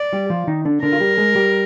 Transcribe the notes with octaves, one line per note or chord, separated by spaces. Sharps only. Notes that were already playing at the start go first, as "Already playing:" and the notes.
Already playing: D5
G3 G4
F3 F4
D#3 D#4
D3 D4
D3 D4 A#4
F4
G3 G4
G#3 G#4
G3 G4